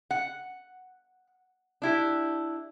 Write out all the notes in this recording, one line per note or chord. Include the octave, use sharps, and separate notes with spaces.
F#5
D4 E4 G4